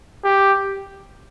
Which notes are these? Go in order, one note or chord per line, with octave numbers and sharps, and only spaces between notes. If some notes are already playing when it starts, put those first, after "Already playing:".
G4